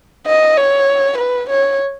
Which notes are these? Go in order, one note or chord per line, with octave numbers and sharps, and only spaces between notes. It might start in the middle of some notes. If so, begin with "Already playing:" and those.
D#5
C#5
B4
C#5